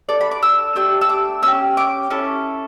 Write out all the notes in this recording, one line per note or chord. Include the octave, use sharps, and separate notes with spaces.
D4 A4 D5
B5
D6
E6
A3 D4 G4 E6
E6
D6
C#4 G4 E6
D6
C#4 E4 A4